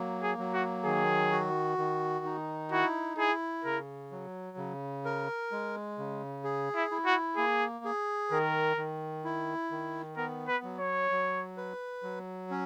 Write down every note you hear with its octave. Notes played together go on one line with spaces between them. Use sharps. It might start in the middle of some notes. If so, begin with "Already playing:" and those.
Already playing: F#3 A#3
G#4
F#3
F#4
D#3 G#4
F#4
D#3
D#4
E4 F#4
E4 G#4
C#3 A#4
F#3
C#3
A#4
G#3
C#3
G#4
E4
E4
F#4
A#3 G#4
G#4
D#3 A#4
D#3
E4
D#3
B3 A#4
B4
F#3
C#5
F#3
B4
F#3
C#4